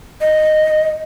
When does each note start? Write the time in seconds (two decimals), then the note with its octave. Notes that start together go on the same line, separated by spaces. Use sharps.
0.21 D#5